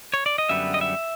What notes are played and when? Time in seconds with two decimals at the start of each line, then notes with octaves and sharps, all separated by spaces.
0.14 C#5
0.26 D5
0.38 D#5
0.49 F#2 D3 G3 B3 E5
0.74 D#5
0.81 E5